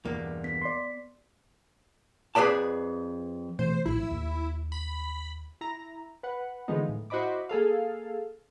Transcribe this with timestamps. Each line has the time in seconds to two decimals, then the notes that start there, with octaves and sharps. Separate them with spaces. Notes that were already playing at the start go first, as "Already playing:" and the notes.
0.05 E2 G2 B2 A#3 D5
0.44 B3 B6
0.62 D5 C6
2.35 F2 G#4 B4 D5 A5
3.59 B2 E3 A3 C5
3.86 A#1 A2 E4
4.11 D#2
4.72 B5
5.61 E4 A#5
6.23 B4 F#5
6.68 D3 E3 F3 G#3 B3 D#4
6.89 A2
7.10 E4 F#4 C5 D#5 B5 D6
7.49 A#3 G#4 A4 F5